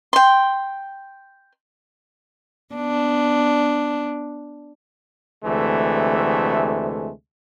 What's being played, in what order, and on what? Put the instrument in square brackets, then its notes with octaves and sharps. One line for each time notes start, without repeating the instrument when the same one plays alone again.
[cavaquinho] G5 C6
[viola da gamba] B3 D4
[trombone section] D2 C3 E3 G#3 A3